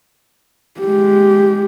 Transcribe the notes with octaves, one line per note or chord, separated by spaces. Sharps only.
G#3 G4